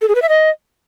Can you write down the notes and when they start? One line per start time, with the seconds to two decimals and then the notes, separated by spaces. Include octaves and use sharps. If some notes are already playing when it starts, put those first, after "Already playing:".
0.02 A4
0.08 G#4
0.15 B4
0.22 E5
0.29 D#5